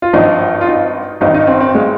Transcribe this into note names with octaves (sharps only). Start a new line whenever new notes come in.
F4
G#1 G2 F3 D#4
F4
D#4
G#1 G2 D#3 D#4
D#4
C4
C4
G#3